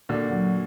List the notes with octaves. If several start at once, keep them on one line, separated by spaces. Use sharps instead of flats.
A#2 D3 F#4
F#3